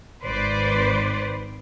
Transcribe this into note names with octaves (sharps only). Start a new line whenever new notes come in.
G#1 D#3 B4 C5 D5